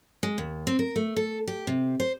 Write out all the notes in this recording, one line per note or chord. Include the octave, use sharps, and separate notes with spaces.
G#3
D#2
C4
A#4
A3
A4
G4
C3
C5